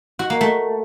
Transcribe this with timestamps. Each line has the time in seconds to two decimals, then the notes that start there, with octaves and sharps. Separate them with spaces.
0.19 F#4
0.30 A#3
0.41 A3